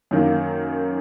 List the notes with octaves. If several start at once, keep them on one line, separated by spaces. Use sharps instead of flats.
F#2 D#3 A#3